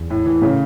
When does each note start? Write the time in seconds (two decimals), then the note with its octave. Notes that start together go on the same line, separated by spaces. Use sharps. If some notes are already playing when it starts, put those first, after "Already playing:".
Already playing: E2
0.10 A2
0.26 E3
0.42 A2 C#3